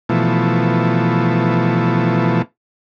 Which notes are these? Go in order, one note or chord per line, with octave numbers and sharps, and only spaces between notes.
B2 E3 F3 A3